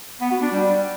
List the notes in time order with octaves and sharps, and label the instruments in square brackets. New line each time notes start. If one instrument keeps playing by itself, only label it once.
[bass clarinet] B3
F#4
D4
G3